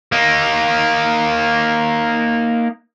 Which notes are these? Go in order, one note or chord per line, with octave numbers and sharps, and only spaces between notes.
A#3 D#4